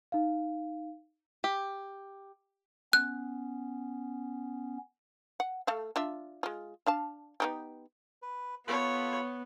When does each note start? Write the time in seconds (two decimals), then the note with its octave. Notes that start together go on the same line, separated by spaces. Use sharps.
0.12 D#4 F5
1.44 G4
2.93 B3 C#4 F#6
5.40 F#5
5.67 A3 A4 F5
5.96 D4 F4 E5
6.43 G#3 F4
6.86 D4 F5 A5
7.40 B3 D#4 G4
8.22 B4
8.67 B3 F4 A4 C#5 B5